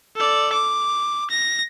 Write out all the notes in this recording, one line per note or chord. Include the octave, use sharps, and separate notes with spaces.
A4 D5
D6
A#6